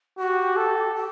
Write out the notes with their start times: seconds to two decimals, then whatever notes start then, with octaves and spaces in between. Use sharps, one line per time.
0.18 F#4 G4
0.56 A4
0.94 G4